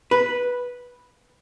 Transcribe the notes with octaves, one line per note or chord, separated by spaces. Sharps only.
B4